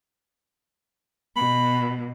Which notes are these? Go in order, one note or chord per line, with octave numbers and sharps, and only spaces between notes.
B2 B5